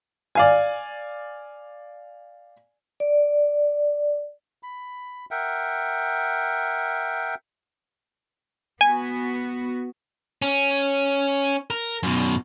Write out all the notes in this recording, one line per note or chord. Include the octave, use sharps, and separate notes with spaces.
D5 F5 G#5
D5
B5
A#4 E5 F#5 G5
B3 F#4 G#5
C#4
A#4
F#2 B2